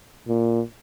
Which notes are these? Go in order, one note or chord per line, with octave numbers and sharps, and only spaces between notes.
A#2